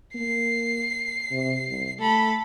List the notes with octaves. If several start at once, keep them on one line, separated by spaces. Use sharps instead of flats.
A#3 C7
C3
C2
A3 A4 B5